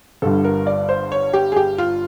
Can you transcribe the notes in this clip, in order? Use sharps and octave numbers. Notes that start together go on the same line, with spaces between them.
G1 G2 D3 G3 A4
A#4
D5
C5
C#5
G4
G#4
G4
F4